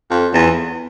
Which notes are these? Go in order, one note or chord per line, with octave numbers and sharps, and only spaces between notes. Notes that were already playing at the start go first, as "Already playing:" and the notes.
F2
E2